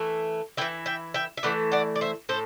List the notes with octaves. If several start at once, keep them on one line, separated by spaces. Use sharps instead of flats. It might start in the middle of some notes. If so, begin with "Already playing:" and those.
Already playing: E3 A3 E4
E3 A3 E4 E5 G5
E5 G5
E5 G5
E5
E3 A3 E4 D5 F#5
D5 F#5
D5
C5 E5
A2 A4 C5